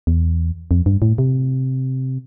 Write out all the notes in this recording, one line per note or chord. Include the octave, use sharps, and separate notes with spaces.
E2
F2
G2
A2
C3